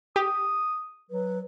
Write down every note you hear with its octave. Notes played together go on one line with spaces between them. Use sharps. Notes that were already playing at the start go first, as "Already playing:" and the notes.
G4 D#6
F#3 B4